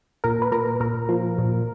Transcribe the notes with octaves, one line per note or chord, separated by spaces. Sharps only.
A#2 A#4
B4
A#2 A#4
A#2 A#4
F3
A#2